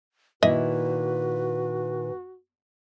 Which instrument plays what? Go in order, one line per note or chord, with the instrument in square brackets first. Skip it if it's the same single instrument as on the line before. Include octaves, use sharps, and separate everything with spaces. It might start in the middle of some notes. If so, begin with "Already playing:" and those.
[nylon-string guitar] A#2 D#3 E4 [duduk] F#4 [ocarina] B4 [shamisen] D#5 E5